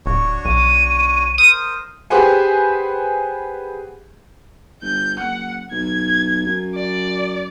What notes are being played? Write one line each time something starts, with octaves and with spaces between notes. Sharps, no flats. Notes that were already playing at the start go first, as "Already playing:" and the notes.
D1 D4 F#4 C#5
B1 D#7
A#4 C5 D#6
G4 G#4 B4 C5 F#5 G#5
G1 G6
F#1 F#5
B1 G#6
F#2
D5